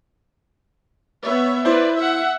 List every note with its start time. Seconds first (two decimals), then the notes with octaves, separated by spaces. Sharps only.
1.24 B3 C#5 E5
1.65 E4 B4 C5 D5
1.96 E5 F#5